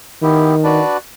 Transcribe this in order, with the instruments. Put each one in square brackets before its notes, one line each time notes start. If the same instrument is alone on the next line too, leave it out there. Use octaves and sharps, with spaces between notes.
[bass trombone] D#3 [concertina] B3 E4 G4
[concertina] D4 F#4 B4 D5